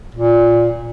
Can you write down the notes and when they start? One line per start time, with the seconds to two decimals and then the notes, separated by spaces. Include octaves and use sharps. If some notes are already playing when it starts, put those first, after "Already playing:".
0.14 A#2